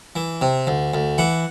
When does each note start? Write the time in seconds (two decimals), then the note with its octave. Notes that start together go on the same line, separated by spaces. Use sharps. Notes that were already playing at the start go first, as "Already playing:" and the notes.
0.16 E3
0.41 C3
0.67 D2
0.94 D2
1.18 E3 F#5